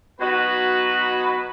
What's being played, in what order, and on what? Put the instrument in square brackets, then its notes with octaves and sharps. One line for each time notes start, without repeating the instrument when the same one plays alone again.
[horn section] F#3 B3 D#4 F#4 B4